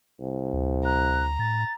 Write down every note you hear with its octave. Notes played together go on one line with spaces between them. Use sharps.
C2
D2
A#5 F#6
A2 A6